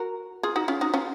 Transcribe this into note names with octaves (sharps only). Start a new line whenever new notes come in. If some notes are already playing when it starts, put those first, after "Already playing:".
Already playing: F#4 A#4
F4 G#4
D#4 F#4
C#4 F4
D#4 F#4
C#4 F4